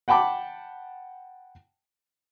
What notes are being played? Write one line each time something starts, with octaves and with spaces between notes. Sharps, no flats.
F#5 G5 A5 B5 D6